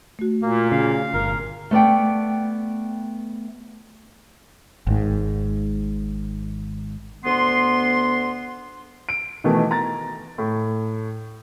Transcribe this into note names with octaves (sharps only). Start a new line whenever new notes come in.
A3 F#4
A#2 A#3
C#3 F5
G1 A#4
A3 B3 D5 G5
G#1 G#2
D2 B3 C6
D7
B2 D#3 E3 A3
A#5 A6
A2